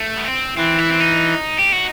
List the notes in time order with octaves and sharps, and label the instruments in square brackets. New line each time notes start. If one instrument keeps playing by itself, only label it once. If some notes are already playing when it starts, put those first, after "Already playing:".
Already playing: [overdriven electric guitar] A3
B3
C4
[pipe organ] E3 [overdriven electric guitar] C4
[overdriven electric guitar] E4
C4
D#4
G4
F#4